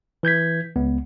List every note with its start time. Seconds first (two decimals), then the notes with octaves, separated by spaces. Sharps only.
0.23 E3 G6 G#6 B6
0.76 C#2 B3